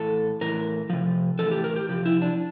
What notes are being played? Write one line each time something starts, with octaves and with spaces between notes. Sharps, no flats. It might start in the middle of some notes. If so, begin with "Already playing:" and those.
Already playing: A2 E3 A4
A2 E3 A#4
C3 F3
A2 E3 A4
G4
A#4
G4
C3 F3 G4
E4
D4